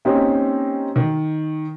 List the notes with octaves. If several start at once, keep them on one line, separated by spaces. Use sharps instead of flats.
A#3 C4 C#4 D#4 G4
D#3